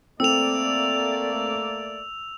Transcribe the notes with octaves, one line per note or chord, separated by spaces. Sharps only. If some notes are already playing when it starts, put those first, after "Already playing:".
A3 A#3 C4 A4 D5 E6 F7